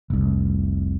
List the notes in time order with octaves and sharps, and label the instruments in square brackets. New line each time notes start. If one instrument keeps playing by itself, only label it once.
[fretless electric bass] F1 C2